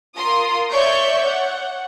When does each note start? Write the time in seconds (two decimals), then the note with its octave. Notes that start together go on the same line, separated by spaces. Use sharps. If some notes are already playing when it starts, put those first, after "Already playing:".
0.17 F4 A#4 C6 D#6
0.72 C#5 D5 E5 C#6 G6
1.25 F#5